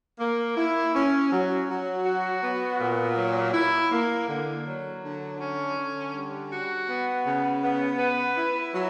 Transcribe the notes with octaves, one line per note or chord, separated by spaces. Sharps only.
A#3
E4
C#4
F#3
F#3
F#4
B3
A#2
F#3
E4
A#3
D3
F#3
D3
C#4
D3
G3
F#4
B3
C#3
B3
B4
E4
F#3